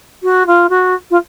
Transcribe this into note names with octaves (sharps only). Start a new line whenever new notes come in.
F#4
F4
F#4
F4